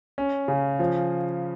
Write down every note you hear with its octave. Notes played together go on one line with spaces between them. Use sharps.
C#4
C#3
F3